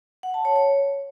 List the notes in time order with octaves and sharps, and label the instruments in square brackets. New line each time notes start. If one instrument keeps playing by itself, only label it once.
[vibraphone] F#5
A5
C#5
C#5